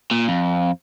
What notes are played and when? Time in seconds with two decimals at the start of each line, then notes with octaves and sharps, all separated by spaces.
0.11 A#2
0.28 F2